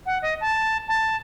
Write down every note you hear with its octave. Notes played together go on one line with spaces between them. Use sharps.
F#5
D#5
A5
A5